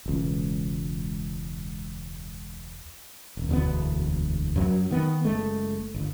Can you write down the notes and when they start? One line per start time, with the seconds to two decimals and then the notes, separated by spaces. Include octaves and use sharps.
0.06 E1 C#2
3.37 D#1
3.49 E1 D2 B3
4.56 F#2 F#3
4.91 D#3 B3
5.25 F#1 G#3 A3
5.94 G1